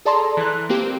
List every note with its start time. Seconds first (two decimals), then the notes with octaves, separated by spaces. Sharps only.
0.05 G#4 A4 D5 A5 A#5 C6
0.37 E3 F#6
0.69 A#3 C4 G4